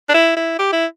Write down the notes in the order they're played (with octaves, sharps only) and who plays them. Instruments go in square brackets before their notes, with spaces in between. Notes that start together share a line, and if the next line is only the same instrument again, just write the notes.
[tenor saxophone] D4
E4
E4
G4
E4